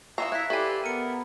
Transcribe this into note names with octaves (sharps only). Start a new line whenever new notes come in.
E3 G#3 D#5 F5 A#5 C#6 E6
E4 E5 A#5 F#6 B6
E4 G4 A4 B4 D5 G#5 C6
B3 A#4 C#7 D#7